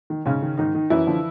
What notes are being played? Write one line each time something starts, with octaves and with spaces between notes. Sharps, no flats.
D#3
G#2 C#3 C#4
D#3
G#2 D#3 D#4
D#3
F#2 E3 E4
D3 F3